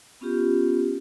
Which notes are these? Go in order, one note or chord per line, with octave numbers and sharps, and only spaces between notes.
B3 C#4 F4 G4